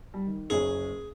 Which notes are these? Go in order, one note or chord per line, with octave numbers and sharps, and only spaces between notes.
G3
D#3
F#1 G#4 C#5